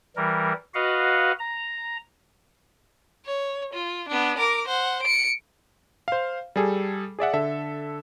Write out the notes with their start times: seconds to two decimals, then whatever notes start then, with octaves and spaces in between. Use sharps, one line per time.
0.16 E3 G3 A#4
0.75 F#4 B4 D#5 F5 F#5
1.39 A#5
3.25 C#5
3.73 F4
4.09 B3 D4
4.38 A#4 D6
4.68 C5 F#5
5.03 C#7 D7
6.08 C5 F5
6.56 G3 G#4 A4
7.19 G#4 D5 E5 F#5
7.33 D3 A4 E5